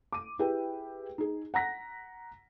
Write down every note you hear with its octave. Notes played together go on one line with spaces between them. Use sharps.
D6 D#7
E4 G4 G#4 B4 G5
D#4 G#4
F#5 A#5 A#6 B6